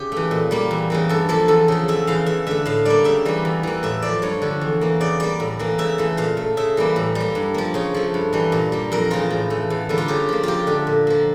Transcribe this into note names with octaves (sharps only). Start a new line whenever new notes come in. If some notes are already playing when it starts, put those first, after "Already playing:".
Already playing: C#3 G4
E3 A3
A#2
G3 A#3
E2
C#3 E3 A#3
G2 A4
F3 A#3 A4
E2 A4
C#3 F3
E2 E5
C#3 E3 F5
E2 E5
D3 A3 E5
A2 F5
G3 A#3 D5
C#3 E5
E3 G3 A#3
E2
E3 A#3
A2 E5
F3 A#3 D5
G2 C#5
D3 F3
E2
E3 A#3
C#3 D5
G3 A#3 D5
A2
E3 A#3
C#3 E5
E3 A3
A#2 F5
A3
C#3 E5
E3 G3 A#3
A2
G3
A#3
G2
F3 A#3
C#3 C#5
F3 A3
G2
E3 G3 A#3
A#2
G3 A#3
F2 A#4
C#3 E3 F4
A2
E3 A3
E2
D3 G3 A#3
F4
C#3 G4
F3 A#3
F2 F4 G4
D3 A3
A#2
F3 A#3